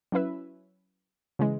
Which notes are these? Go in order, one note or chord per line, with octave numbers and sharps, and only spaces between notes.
F#3 C#4 E4 B4 E5
C#3 E3 G#3